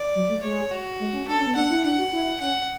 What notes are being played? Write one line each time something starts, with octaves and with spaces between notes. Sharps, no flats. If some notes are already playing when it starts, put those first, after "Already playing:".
Already playing: D5
F#3
A3
G#3 C#5
F#4
G#3
C#4
D4 A4
C#4
B3
D4 F#5
E4
D4 F#5
F#4
E4
C#4 F#5